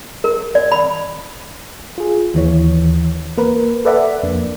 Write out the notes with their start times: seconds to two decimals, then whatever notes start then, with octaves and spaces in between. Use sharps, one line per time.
0.24 A#4
0.55 D5
0.72 B5
1.98 F4 G#4
2.34 D#2 E3 C#5
3.38 A#3 A#4 B4
3.85 A4 B4 D5 E5 F#5 B5
4.23 F2 A#3 D4